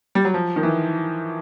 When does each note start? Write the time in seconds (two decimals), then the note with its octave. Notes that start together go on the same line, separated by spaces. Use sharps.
0.15 G3
0.25 F#3
0.34 F3
0.56 D#3
0.63 E3